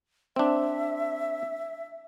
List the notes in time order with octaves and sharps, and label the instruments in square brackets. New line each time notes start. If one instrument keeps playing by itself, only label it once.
[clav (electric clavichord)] C4 D4 [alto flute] E5